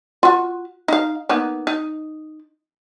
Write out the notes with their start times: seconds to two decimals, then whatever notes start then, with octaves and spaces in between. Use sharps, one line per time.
0.23 F4 F#4
0.88 D#4 F5
1.29 A#3 B3 D#4
1.67 D#4